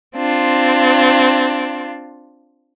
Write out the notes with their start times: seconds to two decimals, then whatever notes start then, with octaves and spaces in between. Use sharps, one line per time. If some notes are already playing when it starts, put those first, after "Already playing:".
0.15 C4 D4 F4